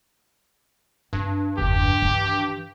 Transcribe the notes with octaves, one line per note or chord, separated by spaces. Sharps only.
G2 C4
F#1 E2 G4
D#3 E3